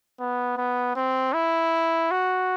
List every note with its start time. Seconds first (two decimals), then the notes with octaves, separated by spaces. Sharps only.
0.20 B3
0.57 B3
0.96 C4
1.34 E4
2.11 F#4